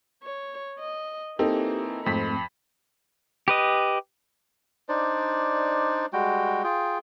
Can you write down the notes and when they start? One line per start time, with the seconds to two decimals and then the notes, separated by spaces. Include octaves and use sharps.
0.23 C#5
0.79 D#5
1.39 E3 A#3 C4 D#4 G4 A4
2.06 F2 G#2 A3 C4 B5 B6
3.48 G4 B4 D#5
4.89 D4 D#4 C5 D5
6.13 G3 G#3 F#4 G5
6.64 F4 G#4 G5